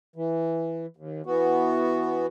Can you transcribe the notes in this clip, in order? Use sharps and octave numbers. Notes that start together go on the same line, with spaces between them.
E3
D#2
E3 B3 F#4